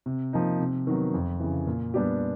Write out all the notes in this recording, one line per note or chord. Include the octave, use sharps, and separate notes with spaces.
C3
F3 A#3 D#4
C3
D#3 F#3 B3
F2
C#3 E3
A#2
G3 B3 D4 G4